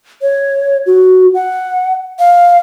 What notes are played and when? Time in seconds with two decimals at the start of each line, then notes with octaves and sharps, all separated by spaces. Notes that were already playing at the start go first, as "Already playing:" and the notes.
0.22 C#5
0.86 F#4
1.34 F#5
2.19 F5